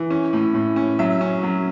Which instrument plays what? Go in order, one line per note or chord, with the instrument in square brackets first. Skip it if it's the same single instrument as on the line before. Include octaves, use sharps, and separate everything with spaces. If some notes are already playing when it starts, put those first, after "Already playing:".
Already playing: [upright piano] E3
C#4
A2
A2
C#4
F#3 E5
C#4
F#3